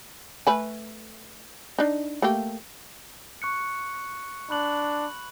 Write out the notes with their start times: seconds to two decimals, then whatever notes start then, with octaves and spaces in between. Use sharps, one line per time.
0.47 A3 B4 G#5
1.79 D4 D#4
2.22 A3 A#3 G4
3.42 C#6 F#6 C#7
4.50 D4 B5 F#6 F#7